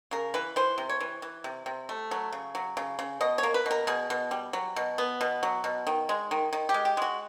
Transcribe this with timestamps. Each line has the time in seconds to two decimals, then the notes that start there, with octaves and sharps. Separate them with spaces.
0.11 C#3 A#4
0.34 E3 B4
0.56 E3 C5
0.78 C3
0.89 C#5
1.00 E3
1.22 E3
1.44 C3
1.66 C3
1.89 A3
2.11 F#3
2.33 C#3
2.55 F#3
2.77 C#3
2.99 C#3
3.21 B2 D#5
3.38 C#5
3.43 A#3
3.54 B4
3.66 B2 A#4
3.87 B2 G#4
4.10 B2
4.31 G3
4.53 F#3
4.76 B2
4.98 B3
5.21 B2
5.43 F#3
5.64 B2
5.87 D#3
6.09 G#3
6.31 D#3
6.53 D#3
6.69 G4
6.74 G#3
6.85 G4
6.97 G#3 F#4